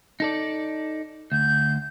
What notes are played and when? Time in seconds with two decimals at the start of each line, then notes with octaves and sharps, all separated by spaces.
0.20 D#4 A4 D5
1.32 D2 G6